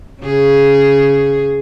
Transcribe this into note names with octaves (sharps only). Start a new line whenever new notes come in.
C#3 G#4